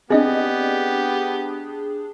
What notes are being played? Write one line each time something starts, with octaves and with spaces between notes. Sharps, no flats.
B3 C4 D4 G4 G#4 D#5